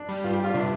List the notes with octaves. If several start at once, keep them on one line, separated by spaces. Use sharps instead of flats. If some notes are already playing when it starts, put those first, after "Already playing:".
Already playing: D4
G3
G2 F4
G4
G2 F4
F4
C3 D4